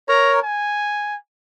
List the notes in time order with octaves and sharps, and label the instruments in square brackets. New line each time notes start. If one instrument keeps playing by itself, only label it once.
[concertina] A#4 C#5 [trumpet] A#5
[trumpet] G#5